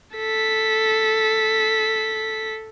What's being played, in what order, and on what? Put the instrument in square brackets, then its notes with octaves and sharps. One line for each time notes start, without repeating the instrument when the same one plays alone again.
[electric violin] A4 B6